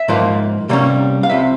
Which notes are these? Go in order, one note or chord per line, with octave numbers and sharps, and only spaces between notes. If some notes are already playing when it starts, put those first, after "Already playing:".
Already playing: E5
G#2 F3 A#3
C3 G3 A#3 C#4
F5
C2 C3 F3 E5